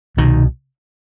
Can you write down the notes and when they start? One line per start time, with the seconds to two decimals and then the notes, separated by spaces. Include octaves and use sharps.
0.17 C2 B2 D#3